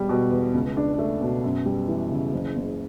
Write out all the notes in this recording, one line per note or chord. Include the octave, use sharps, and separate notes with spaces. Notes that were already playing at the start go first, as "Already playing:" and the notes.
Already playing: E1 G3
B2
E2
C#2
D4
A3
B2
F#2
G3
E3
C#3
F#1
F#1